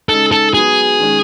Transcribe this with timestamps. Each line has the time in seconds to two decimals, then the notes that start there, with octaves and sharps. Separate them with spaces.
0.09 C#3 G#3 D#4 A4
0.32 A4
0.54 F#3 B3 F#4 G#4
0.99 D#3 G#3 C#4